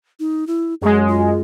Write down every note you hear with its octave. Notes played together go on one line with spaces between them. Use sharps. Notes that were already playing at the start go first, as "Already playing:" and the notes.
D#4
E4
F#2 G#3 G#4
F4